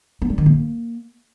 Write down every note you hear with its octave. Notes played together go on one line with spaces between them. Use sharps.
B3
G3
D#3
A#3